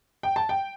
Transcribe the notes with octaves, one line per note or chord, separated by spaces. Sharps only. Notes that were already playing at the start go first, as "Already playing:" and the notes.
G5
A5
G5